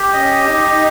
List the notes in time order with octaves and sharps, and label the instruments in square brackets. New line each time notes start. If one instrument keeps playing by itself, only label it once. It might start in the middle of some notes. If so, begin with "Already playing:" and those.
Already playing: [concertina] G4
[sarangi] C#4 [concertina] D#5
[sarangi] D#4 [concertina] G4